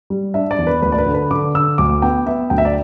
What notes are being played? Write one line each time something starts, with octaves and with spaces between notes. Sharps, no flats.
G3
D4 E5
D5
E2
B4
D2 B4
D5
B4
D3
B4
D3 D6
D3 E6
D2 D6
B3 G5
B3 E5
D2 G5
E5
D5